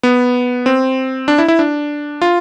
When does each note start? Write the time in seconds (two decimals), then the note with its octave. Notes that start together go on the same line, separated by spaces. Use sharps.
0.03 B3
0.66 C4
1.28 D4
1.38 E4
1.48 E4
1.59 D4
2.22 F4